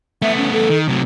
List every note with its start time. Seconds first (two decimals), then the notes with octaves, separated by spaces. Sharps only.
0.22 A3 B3 E5
0.37 C#4
0.52 A4
0.70 D#3
0.88 C3 F#3 A3